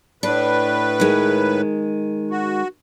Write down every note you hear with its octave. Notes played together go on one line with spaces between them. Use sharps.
A2 D4 B4
D#3 G#3
F#4